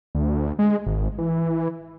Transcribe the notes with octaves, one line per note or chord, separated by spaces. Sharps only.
D2
G#3
G#1
E3